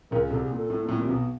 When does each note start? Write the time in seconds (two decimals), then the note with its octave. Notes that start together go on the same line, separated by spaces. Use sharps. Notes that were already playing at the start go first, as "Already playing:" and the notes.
0.11 C#2 C#3 A#4
0.31 C2 C3 A4
0.44 G#4
0.51 A#2
0.57 A4
0.70 A2
0.82 A#2
0.88 A2
0.96 A#2
1.01 C3
1.08 B1 B2